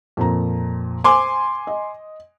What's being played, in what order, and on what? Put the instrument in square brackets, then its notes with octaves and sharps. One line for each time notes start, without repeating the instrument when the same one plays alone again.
[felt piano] F2 A#2 A#5
[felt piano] C5 [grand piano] G#5 C6 D6
[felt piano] D#5